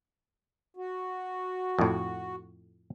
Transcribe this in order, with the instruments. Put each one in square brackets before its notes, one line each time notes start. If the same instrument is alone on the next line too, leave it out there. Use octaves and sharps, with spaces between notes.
[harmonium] F#4
[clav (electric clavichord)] F2 A2